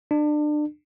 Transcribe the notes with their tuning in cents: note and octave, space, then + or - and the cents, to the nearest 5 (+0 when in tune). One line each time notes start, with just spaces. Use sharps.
D4 +30